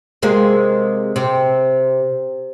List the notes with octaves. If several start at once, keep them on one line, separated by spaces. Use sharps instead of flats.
C3 G#3 A#3
C3